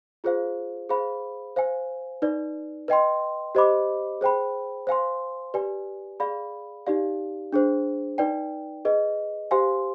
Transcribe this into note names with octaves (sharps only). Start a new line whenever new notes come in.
F4 G#4 C5 F5
G#4 C5 F5 B5
C5 F5 G#5
D#4 B4 D5
B4 D#5 G5 C6
G4 C5 D#5 B5 D6
G#4 C5 G5 B5
C5 F5 G#5 C6
G4 B4 D5 G#5
G#4 D5 F5 B5
D#4 G4 D5 F5
D4 G#4 C5
D#4 B4 D5 G5
G#4 B4 D#5
G4 C5 F5 G#5 C6